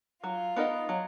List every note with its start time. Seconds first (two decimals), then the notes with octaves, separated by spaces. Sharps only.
0.23 F#3 F4
0.56 B3 D#4 A#4 D#5
0.89 F#3